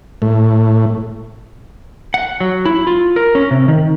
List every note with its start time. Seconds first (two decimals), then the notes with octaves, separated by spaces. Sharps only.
0.22 A2
2.14 F#5
2.40 F#3
2.66 E4
2.87 F4
3.16 A#4
3.35 C#4
3.51 C3
3.68 D#3